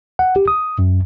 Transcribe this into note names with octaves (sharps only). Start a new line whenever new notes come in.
F#5
G4
D#6
F#2